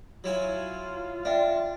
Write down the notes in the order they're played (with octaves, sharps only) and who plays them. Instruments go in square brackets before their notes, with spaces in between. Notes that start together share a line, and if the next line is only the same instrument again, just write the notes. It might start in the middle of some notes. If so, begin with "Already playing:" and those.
[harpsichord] F#3 E4 G#5 [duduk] F4
[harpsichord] D4 [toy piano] D5 E5 G5